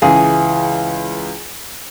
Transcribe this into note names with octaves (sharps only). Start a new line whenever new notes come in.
C#2 E3 G#4